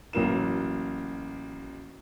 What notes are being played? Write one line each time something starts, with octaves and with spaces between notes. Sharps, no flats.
A1 F#3 A#3 E7